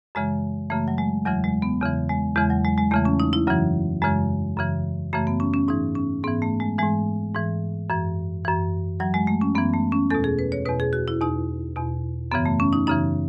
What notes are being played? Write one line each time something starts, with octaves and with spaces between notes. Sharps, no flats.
F#2 C#3 E3 G#3
F#2 C#3 E3 A3
F#3
G#3
E2 C#3 E3 F#3
G#3
B3
E2 C#3 E3
G#3
E2 C#3 E3 G#3
F#3
G#3
G#3
E2 C#3 E3 A3
C#4
D#4
E4
F#2 C#3 E3 F#3
F#2 C#3 E3 G#3
F#2 C#3 E3
F#2 C#3 E3 A3
B3
C#4
C#4
G#2 E3 D#4
C#4
G#2 E3 B3
A3
G#3
G#2 E3 G#3
G#2 E3
F#2 E3
F#2 E3
F#2 E3 F#3
G#3
A3
C#4
F#2 E3 B3
A3
C#4
E2 B2 A4
G#4
B4
C#5
E2 B2 B4
G#4
F#4
E4
E2 B2 D#4
E2 B2
F#2 C#3 E3 B3
A3
C#4
D#4
F#2 C#3 E3 D#4